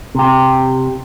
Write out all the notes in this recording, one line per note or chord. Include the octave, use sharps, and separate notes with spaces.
C3 G4